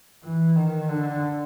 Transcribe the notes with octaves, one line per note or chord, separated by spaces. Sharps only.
E3
D#3
D3